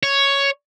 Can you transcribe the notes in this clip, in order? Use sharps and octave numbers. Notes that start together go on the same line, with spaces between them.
C#5